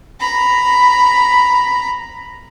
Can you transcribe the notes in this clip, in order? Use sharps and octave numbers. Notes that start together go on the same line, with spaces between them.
A#5 B5